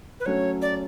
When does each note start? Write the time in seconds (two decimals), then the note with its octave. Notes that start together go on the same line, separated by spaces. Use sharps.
0.20 B4
0.26 F#3 A3 C#4 C#5
0.62 D5